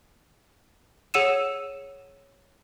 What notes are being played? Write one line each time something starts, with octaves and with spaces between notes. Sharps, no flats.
G#4 C#5 F#5 E6 D#7 E7